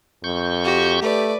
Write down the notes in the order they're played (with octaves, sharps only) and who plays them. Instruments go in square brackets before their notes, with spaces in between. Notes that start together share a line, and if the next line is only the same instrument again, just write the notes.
[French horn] F2 [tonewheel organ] C#6 G6
[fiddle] F#4 [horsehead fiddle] G4
[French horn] A3 [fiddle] B4 D5